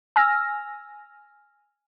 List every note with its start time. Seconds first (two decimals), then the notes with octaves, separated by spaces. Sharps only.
0.16 G#5 E6 F6 A#6